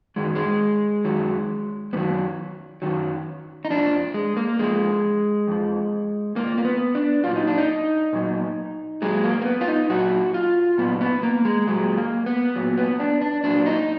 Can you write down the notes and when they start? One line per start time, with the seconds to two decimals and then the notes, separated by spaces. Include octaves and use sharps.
0.16 F#2 D#3 F#3 G#3
0.35 G#3
1.05 F#2 D#3 F#3
1.93 F#2 B3
1.96 D#3 F#3
2.82 F#2 D#3 F#3
3.65 D#4
3.70 F2 F3 D4
4.14 G#3
4.37 A#3
4.59 F2 F3 G#3
5.48 F2 F3
6.35 F2 F3 A#3
6.58 A#3
6.65 B3
6.95 D4
7.24 A#2 F#3 F4
7.36 D#4
7.47 D4
7.58 D#4
8.13 A#2 F#3
9.02 A#2 F#3 G#3
9.24 A#3
9.41 A#3
9.45 B3
9.61 F4
9.68 D#4
9.90 A#2 F#3 F#4
10.34 F4
10.78 A#2 F#3 B3
11.01 B3
11.23 A#3
11.45 G#3
11.67 A#2 F#3 G#3
11.97 A#3
12.26 B3
12.56 A#2 F#3
12.78 B3
12.99 D4
13.21 D4
13.44 A#2 F#3 D4
13.66 D#4